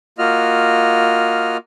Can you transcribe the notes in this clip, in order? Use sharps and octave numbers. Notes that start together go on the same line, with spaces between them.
A#3 F4 F#4 D#5 F6